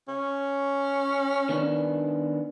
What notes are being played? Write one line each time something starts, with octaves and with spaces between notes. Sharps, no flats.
C#4
D#3 B3 D4